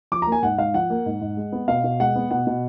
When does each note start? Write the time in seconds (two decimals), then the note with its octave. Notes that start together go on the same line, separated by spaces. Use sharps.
0.12 F3 D6
0.22 A#3 A#5
0.32 G#5
0.42 G#2 F#5
0.58 G#2 F5
0.74 F3 F#5
0.90 A#3
1.06 G#2
1.21 G#2
1.37 G#3
1.52 B3
1.68 B2 F5
1.84 B2
2.00 G#3 F#5
2.15 B3
2.31 B2 F#5
2.47 B2